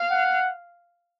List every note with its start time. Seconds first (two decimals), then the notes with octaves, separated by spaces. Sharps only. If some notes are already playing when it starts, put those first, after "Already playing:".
Already playing: F5
0.11 F#5